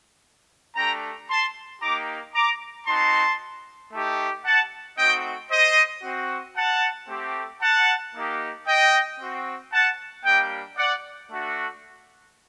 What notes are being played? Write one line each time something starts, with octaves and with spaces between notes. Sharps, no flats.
A3 D4 G4 G5 A#5
A5 C6
A#3 D#4 G4 A#5 D6
A#5 D6
C4 D#4 F#4 A5 C6
A3 D#4 G4
F#5 A5
A3 C4 D#4 F#4 D#5 G5
C5 D#5
C4 F#4
F#5 A5
A3 C4 G4
F#5 A5
A#3 D#4 G4
D#5 G5
C4 F#4
F#5 A5
G3 A#3 D4 G4 D#5 G5
D5 F#5
A3 D4 F#4